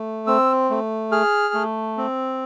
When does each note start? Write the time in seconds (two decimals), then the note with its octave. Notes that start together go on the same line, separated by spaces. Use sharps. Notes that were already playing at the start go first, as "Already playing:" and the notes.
Already playing: A3
0.27 C4 E6
0.70 A3
1.11 G#4 F6
1.54 A3
1.97 C4